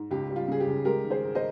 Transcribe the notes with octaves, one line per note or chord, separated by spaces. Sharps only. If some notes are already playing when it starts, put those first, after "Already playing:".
Already playing: G#2
C#2 G4
G3
F4
C#3 G#4
G4
C#2
G#3 G4 A#4
D#3
G#4 C5
G#2
C5 D#5